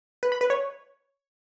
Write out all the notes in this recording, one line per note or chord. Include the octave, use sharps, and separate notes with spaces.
B4
B5
B4
C#5